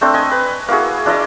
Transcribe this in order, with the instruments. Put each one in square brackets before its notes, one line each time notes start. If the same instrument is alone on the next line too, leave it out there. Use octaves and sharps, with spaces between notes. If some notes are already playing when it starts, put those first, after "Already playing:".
[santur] A3 C4 D4 A4
D#5 G#5
B4
A#3 E4 F#4 G#4
D4 E4 D5 D#5